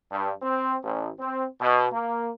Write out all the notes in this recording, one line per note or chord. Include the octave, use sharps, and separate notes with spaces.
G2
C4
A1
C4
B2
A#3